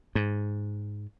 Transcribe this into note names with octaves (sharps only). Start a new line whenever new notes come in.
G#2